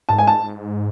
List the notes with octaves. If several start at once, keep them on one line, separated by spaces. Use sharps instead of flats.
G#2 A5
G#5
A5